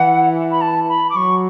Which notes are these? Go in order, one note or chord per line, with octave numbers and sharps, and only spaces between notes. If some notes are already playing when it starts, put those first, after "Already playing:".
Already playing: E3 F#5
B5
A5
B5
D6
F#3 C#6